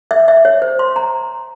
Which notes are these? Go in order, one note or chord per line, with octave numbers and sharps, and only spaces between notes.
E5
E5
C#5
C5
C6
A#5